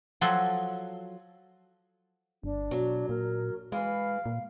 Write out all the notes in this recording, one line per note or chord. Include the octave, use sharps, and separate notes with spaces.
F3 F#3 F#4 A4 C6
G1 D4
B2 F#3
A#2 A#4
E3 G#3 B4 F5
A#2